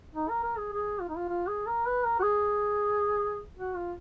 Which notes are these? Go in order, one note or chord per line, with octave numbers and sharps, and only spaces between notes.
D#4
A#4
A#4
G#4
G#4
F4
D#4
F4
F4
G#4
A#4
B4
A#4
F#4
G#4
F#4
F4